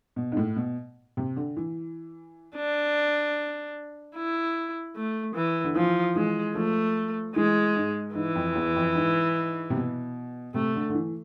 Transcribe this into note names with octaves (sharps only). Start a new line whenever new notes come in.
B2
G#2
A2
B2
C3
D3
E3
D4
E4
A3
E3
D3
E3 F3
E3 G#3
F3 A3
E3 G#3
G#2
G#2 E3
F2
E2
F2
G#2
C3
B2
C3 A3
D3
D3
E3